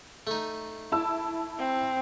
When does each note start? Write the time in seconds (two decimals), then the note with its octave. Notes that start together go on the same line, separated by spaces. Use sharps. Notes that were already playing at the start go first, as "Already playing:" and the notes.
0.27 A3 D#4
0.92 E4 A5 E6
1.58 C4